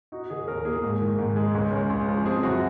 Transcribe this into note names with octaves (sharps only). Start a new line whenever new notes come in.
D#4 F#4
D#3 G#4
D#2 A#4
A#3 G#4
G#2
D#3
G#2
G#3
C#2
C#3
C#2
F3
C4 G#4
F#2 F#4